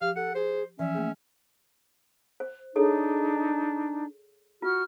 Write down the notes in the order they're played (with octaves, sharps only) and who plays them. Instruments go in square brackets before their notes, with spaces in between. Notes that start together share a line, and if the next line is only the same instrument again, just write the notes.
[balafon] F3 [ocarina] G4 [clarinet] F5
[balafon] G4 [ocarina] A4 [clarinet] F#5
[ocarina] G#4 [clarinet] C5
[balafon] E3 F3 D5 [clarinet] C#4 [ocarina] E5
[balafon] A3 A#3 G#4
[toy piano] C5
[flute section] D4 D#4 [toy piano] G#4 A4 C#5
[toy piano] F4 [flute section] F#4 F6